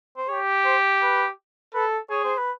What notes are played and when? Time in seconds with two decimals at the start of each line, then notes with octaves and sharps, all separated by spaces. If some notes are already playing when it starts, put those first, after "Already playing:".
0.17 C5
0.29 G4 C#5
0.65 C5
1.02 B4
1.74 A4 B4
2.10 G#4 C#5
2.24 C5
2.38 B4